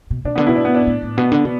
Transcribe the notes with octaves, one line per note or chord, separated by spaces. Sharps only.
B2
B2 D4
D3 B3
B2 E4
D4
B3
D4
A2
A2
B2 B3
D3
B2